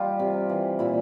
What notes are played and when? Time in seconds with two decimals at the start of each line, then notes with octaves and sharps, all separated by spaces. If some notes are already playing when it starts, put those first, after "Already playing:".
Already playing: G3 F4 G4
0.19 C3
0.49 E3
0.79 A#2 E4